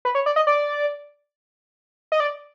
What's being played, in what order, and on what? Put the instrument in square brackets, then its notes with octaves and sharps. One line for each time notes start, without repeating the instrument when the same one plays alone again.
[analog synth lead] B4
C#5
D5
D#5
D5
D#5
D5